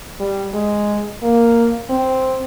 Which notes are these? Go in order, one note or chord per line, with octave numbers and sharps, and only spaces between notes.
G3
G#3
A#3
C4